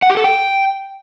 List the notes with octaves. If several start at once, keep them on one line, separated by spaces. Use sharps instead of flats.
F#5
G4
A4
G5